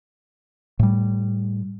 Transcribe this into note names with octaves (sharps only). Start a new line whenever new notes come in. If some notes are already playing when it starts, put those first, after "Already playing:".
A2 G3